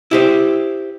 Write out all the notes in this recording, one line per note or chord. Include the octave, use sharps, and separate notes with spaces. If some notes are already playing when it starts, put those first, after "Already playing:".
E4 G4 C5